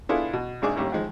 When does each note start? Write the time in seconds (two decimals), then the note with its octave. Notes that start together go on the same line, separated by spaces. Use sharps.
0.09 B3 D4 E4 F4 G#4 A4
0.33 B2
0.62 G#1 G#3 D4 G#4 D6
0.76 A1 D#2 G3
0.92 D#3 F3 G#3